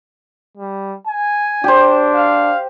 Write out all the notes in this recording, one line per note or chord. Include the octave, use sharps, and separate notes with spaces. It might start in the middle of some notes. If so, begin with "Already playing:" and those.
G3
G#5
D4 G4 C5
F5